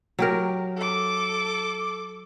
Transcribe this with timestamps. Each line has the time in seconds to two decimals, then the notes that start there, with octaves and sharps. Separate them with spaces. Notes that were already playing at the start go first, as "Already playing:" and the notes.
0.19 F#3 G4 A#4
0.76 A4 D6